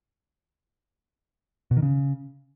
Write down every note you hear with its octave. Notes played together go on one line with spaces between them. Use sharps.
B2
D#3
C#3